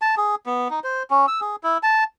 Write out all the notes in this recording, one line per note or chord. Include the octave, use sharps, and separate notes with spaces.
A5
G#4
B3
D#4
C5
C#4
E6
G#4
E4
A5